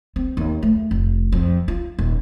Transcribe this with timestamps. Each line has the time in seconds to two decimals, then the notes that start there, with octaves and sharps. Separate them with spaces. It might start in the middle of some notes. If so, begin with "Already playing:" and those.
0.16 C4
0.37 D#2
0.62 A3
0.91 F1
1.32 F2
1.68 F4
1.99 D#1